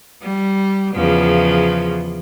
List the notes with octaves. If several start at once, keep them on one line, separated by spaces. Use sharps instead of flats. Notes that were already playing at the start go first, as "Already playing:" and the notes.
G3
E2 C#3 F3